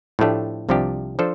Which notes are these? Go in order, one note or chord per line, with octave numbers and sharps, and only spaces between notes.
A2 F3 A3 D4 G4
C2 C3 F3 D4 G4
F3 D4 A4 C5